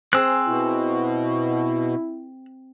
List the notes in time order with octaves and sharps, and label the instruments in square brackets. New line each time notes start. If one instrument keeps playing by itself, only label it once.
[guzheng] C4 G#4 [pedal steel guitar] E6 F#6
[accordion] B2 [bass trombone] E4